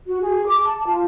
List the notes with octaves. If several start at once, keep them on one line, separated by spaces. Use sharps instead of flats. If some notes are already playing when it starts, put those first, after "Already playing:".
F#4
G#4
D6
A5
F4